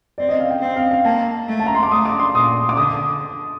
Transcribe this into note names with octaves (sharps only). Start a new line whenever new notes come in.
C4 D5
D#5
F5
G5
C4
F5
F5
A#3 A5
A3
A5
A#5
C6
D6
A3 D#6
D6
C6
A#2 D#6
D6
D3 D#6